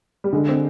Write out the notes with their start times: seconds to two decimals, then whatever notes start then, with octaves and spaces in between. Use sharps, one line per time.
0.24 G3
0.33 D3 G#3
0.49 C4